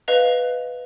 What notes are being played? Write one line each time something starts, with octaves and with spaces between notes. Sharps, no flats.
B4 D#5 F5 F7